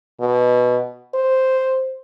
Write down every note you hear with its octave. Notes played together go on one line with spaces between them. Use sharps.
B2
C5